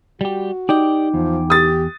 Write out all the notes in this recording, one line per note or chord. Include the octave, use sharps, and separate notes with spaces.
G3 F#4 G4
D#4 G4 D5 D#5 G5 D6
E2 F3
G4 D#6 A6